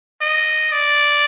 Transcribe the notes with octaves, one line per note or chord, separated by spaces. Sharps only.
D#5
D5